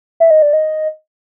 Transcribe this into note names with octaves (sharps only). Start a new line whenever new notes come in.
E5
D#5
D5
D#5